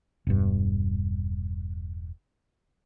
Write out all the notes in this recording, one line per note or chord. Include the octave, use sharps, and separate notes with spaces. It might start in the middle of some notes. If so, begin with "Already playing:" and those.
E1 G2